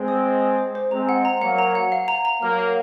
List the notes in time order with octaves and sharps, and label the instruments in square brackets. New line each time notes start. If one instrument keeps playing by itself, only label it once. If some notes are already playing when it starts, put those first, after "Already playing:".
Already playing: [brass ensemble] G#3 C4
[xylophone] D#6
C5
D#6
C5
C5
[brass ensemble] G#3 C4 [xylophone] A#5
[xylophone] F#5
A#5
[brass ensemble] F#3 A#3 [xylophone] F#5
[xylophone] A#5
F#5
F5
A#5
A#5
[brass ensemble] F#3 A#3 [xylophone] F6
[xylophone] F5